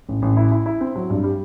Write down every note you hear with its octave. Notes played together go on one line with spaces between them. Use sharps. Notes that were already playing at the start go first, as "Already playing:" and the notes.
A1
A1
E4
E4
E4
C4
F#3
G2
G3